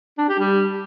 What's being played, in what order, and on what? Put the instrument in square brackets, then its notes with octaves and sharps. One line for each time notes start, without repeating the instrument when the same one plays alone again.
[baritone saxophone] D4
G4
G3